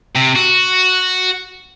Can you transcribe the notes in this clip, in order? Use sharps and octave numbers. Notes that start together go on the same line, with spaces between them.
C3
F#4